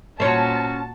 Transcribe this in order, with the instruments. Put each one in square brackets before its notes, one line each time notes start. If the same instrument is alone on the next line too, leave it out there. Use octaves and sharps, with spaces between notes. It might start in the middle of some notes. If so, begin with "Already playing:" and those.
[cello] A#2 F#4 [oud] C#4 C5 [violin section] A5